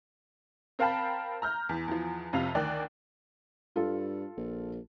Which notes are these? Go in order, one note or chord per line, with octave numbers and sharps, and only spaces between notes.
C4 A#4 F5 G5 A5 B5
A#5 F6 G6
E2
E2 F3
F1 F2 C3 F5 F7
D2 D#3 D5 G5 F#6
G2 F4 A4
A#1